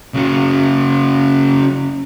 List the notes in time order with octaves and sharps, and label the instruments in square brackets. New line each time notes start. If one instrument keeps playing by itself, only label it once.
[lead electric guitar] C#3 F#3